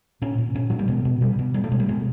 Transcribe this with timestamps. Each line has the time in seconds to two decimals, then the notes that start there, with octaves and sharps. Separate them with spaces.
0.22 A#2 C#4
0.38 A#2
0.55 A#2 C#4
0.70 A#2 F#3
0.79 G3
0.88 B2 G#3
1.05 B2
1.21 B2 G3
1.39 B2
1.54 B2 G3
1.64 A3
1.72 B2 G#3
1.80 G3
1.89 B2 G#3